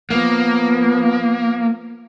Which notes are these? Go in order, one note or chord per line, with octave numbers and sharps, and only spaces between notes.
F3 A#3 B3